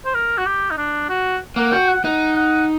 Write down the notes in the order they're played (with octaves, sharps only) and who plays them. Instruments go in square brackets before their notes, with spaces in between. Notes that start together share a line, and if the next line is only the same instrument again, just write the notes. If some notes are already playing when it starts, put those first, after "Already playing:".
[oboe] C5
A#4
F#4
G4
D#4
D4
F#4
[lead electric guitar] A#3 [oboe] F#5
[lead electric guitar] F#4 [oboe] G5
[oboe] F#5
[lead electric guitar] D#4 [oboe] F#5
[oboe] F#5